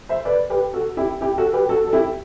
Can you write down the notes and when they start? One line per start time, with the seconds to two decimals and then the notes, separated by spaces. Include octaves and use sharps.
0.09 C5 E5
0.25 B4 D5
0.50 G4 B4
0.73 F#4 A4
0.97 E4 G4
1.21 E4 G4
1.38 F#4 A4
1.53 G4 B4
1.69 F#4 A4
1.87 A4
1.93 E4 G4